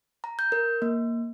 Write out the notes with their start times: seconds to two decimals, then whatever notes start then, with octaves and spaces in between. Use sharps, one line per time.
0.24 A#5
0.39 G6
0.52 A#4
0.82 A#3